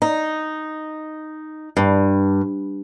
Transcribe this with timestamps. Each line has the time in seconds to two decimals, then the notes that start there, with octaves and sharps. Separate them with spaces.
0.02 D#4
1.77 G2